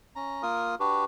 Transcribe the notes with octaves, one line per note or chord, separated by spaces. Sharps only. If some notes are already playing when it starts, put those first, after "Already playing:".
C#4 A#5
A#3 F4 A#4 D#6
D4 F#4 G4 B4